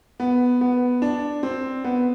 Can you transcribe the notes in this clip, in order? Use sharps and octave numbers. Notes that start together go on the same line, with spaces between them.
B3
B3
D4
C4
B3